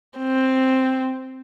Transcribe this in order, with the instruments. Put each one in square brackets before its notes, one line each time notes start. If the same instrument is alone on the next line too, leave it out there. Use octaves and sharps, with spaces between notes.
[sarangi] C4